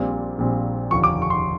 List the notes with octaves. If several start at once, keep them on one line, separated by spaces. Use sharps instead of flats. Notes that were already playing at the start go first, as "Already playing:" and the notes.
Already playing: A#1 A#2 G3 C4
A#1 A#2 G3 C4
F1 D#2 D3 F3 C#6
D6
C#6
C6